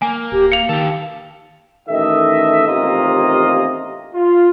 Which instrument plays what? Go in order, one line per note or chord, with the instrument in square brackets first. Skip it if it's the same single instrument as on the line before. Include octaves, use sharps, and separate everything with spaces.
[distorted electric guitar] A#3 [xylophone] G#5
[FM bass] D1 [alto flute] G4
[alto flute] F5 [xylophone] C#7 F7
[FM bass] D#3 [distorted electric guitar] G4 A4
[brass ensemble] A1 D#3 A4 D#5 E5
A1 D#2 C3 A#3 F4 D#5
F4